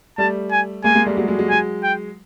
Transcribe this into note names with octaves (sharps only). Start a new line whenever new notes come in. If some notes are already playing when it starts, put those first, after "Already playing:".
G3 A3 A5
G#5
G#3 A#3 G#5
G#3 A#3
G3 A3
F#3 G#3
F#3 G#3
F#3 G#3
G#5
G5